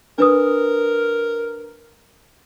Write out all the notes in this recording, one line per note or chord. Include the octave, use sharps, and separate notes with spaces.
D4 A#4 B4 D#6